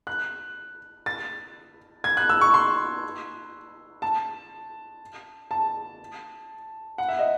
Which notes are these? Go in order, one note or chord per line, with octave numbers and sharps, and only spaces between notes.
F#6
A6
G#6
F#6
E6
C#6
C6
A5
A5
F#5
E5
D#5